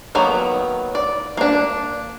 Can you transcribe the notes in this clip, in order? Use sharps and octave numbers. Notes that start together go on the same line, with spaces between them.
D#3 F#3 A#3 B3
D5
A#3 D4